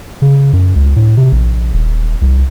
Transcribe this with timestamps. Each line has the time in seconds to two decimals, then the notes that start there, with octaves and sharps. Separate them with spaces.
0.22 C#3
0.53 F#2
0.76 C#2
0.96 A2
1.17 C3
1.32 A#1
1.74 D#1
2.21 C2